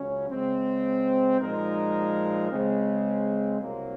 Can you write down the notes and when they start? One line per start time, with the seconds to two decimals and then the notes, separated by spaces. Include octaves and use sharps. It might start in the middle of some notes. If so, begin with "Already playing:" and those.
Already playing: C#2 C#3 F#3 C#4
0.30 C#3 G#3 C4
1.40 A#2 F3 G#3 D#4 A#4
2.50 C#3 G#3 C4
3.60 C2 C3 F#3 A#3